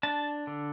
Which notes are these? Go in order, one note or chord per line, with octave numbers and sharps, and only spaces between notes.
D4 A5
D3